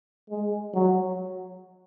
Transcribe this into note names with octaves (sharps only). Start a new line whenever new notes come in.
G#3
F#3